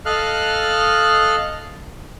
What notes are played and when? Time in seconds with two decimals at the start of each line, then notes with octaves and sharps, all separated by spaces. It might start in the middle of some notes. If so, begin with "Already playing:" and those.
0.06 A4 D#5 F5 F6 F#6